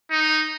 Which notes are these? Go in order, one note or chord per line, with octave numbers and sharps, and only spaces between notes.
D#4